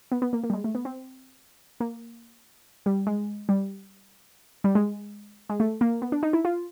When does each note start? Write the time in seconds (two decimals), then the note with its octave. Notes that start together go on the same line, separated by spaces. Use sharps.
0.12 B3
0.22 B3
0.33 A#3
0.43 A#3
0.50 G3
0.53 G#3
0.64 A3
0.75 B3
0.85 C4
1.80 A#3
2.86 G3
3.07 G#3
3.49 G3
4.64 G3
4.75 G#3
5.49 G#3
5.60 A3
5.81 A#3
6.02 B3
6.12 D4
6.23 D#4
6.33 E4
6.45 F4